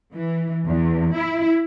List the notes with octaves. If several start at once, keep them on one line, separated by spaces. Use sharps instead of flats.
E3
E2
E4